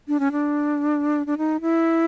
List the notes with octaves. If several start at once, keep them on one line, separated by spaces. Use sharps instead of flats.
D4
C#4
D4
D4
D#4
E4